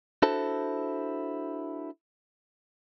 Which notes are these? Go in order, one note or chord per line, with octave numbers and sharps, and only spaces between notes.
D4 E4 F#4 A4 C5 A5